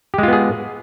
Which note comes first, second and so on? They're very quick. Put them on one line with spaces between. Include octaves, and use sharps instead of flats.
G4 G#3 F4 B3 G#4